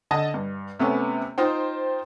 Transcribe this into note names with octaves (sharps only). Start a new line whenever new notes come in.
D3 D#5 A5
G2
C3 A3 B3 C#4
D#4 F4 C5 G5